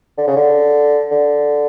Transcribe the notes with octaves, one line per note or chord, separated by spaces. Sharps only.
D3
C#3
D3
D3